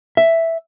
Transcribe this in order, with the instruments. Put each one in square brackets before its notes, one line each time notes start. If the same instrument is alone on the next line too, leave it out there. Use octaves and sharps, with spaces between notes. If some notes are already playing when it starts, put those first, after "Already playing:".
[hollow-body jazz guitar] E5